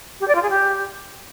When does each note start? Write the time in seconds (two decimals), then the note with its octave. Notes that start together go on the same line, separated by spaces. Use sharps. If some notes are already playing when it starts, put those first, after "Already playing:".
0.20 G4
0.28 D5
0.35 F4
0.43 G#4
0.50 G4